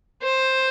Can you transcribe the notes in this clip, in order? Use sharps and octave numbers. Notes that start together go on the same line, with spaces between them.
C5